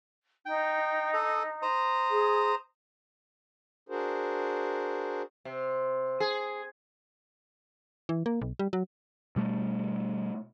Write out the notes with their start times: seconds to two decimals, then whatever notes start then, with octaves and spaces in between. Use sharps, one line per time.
0.46 D#4 G5
1.14 A4 D#6
1.62 C5 A#5 D#6
2.10 G#4
3.89 D4 F#4 G#4 A#4 C5
5.45 C3
6.20 G#4
8.09 E3
8.26 A#3
8.42 B1
8.59 G3
8.73 F#3
9.36 B2 G3 A3